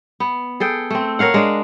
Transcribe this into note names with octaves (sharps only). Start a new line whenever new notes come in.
B3
G#4 A4 G5
A3 C4
A#4 C#5 F5 F#5
G#3 D4